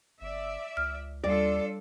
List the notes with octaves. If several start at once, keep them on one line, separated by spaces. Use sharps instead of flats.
G1 D5 E5
C#2 F6
D#2 G3 D4 F4 A4 D5